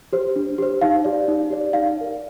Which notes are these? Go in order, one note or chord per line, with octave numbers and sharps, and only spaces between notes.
G4 C5
D4
G4 C5
D#4 F5
G4 D5
D#4
G4 D5
D#4 F5
A#4 D5